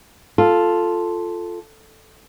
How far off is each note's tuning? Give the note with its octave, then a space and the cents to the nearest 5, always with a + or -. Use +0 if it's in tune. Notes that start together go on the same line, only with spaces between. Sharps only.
F4 +0 A4 +0